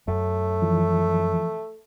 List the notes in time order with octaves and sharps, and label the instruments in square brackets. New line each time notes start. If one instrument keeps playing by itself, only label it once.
[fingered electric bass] F#2 [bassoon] A3
[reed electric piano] E3 F3